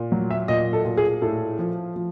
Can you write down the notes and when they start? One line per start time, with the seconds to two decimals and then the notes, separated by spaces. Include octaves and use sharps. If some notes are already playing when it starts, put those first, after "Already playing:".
Already playing: A#2
0.12 F#3
0.31 E5
0.48 A#2 D#5
0.73 A4
0.85 A#2
0.97 G#4
1.22 A2 A4
1.59 F3
1.96 F3